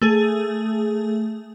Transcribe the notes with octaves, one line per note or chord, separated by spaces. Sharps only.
A3 G#4